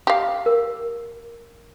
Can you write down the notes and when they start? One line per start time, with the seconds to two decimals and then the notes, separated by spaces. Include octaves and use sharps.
0.07 G4 F5
0.46 A#4